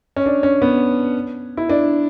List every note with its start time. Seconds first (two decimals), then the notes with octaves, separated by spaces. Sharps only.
0.16 C#4
0.26 D4
0.43 C#4
0.62 B3
1.57 E4
1.69 D4